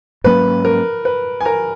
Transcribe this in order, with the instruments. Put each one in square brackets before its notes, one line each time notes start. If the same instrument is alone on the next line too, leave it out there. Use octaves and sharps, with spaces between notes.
[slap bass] G#2 F#3 A#3 C#4 [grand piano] B4
[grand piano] A#4
B4
G#5
A#4 A#5